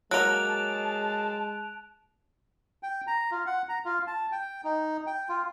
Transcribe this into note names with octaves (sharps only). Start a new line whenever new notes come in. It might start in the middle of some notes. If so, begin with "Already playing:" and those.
F#3 G#3 A#3 A5 F#6 D7 F7
G5
A#5
F4
F#5
A#5
F4
A5
G5
D#4
G5
F4